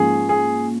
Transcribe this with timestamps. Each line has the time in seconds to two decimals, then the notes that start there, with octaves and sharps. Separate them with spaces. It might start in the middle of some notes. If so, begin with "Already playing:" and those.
Already playing: G#2 F3 A#3 C#4 G#4
0.29 G#4